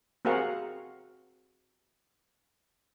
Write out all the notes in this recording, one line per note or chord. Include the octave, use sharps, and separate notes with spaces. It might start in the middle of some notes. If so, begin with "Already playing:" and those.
C4 F#4 G#4 A#4 F5 F#5